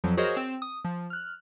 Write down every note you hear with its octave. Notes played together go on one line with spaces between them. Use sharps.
F2 F3 F#3
F#4 G#4 A#4 C5 C#5 D#5
C4 E7
D#6
F3
F6 F#6